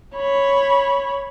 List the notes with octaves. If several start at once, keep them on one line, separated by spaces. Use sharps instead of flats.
C#5 B5